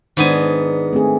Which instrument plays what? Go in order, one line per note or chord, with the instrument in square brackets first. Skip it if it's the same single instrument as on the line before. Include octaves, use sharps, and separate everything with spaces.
[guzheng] G#2 B3 G#5 [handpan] D#3 D4
[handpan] A3 C4 G#4